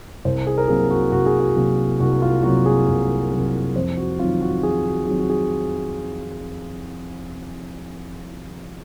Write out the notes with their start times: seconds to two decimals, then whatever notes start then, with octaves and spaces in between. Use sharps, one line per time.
0.25 C2 C5
0.47 G#4
0.58 A#4
0.68 C3 F#3 A#3 G#4
0.90 F#4
1.12 C2 F#4
1.26 G#4
1.40 F#4
1.56 C3 F#3 A#3
2.00 C2 F#4
2.22 F4
2.43 C3 F#3 A#3 F#4
2.66 G#4
2.88 C2
3.32 C3 F#3 A#3
3.76 F2 C5
3.97 F#4
4.19 D#3 F#3 C4 F4
4.41 F#4
4.63 F2 G#4
4.85 F#4
5.06 D#3 F#3 C4 G#4
5.19 F#4
5.30 G#4